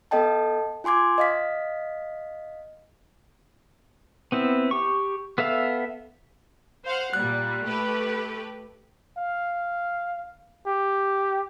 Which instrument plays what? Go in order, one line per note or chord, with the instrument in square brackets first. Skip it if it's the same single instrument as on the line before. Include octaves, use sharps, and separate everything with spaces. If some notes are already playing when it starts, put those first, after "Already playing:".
[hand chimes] B3 A4 D#5 G5 A5
F4 G#5 C6 D6 G#6
D#5 F5 B6
[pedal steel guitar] B3 C4 E4
G4 C#6
B3 A4 E5 F5
[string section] C5 F5 F#5
[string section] A#2 G3 [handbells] F#6
[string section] A3 G4 B4
[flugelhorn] F5
G4